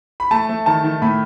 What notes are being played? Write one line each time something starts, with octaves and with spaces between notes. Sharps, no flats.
B5
A3 A5
A3
D#3 A5
D#3
A2 B5